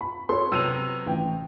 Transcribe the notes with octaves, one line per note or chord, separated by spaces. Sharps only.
B5
A4 C#5 C6
C3 F#3 B3 E6 D#7 F7
A1 G5